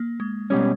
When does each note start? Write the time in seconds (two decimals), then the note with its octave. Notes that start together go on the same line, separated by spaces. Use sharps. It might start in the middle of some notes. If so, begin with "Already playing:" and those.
Already playing: A#3
0.20 G#3
0.50 B2 G3 G#3 C#4